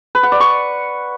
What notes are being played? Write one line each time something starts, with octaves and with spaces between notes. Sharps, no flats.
B4
F#5
D5
C#6